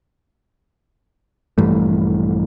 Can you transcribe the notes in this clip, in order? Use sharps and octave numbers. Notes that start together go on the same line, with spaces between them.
A#1 G2 E3 A3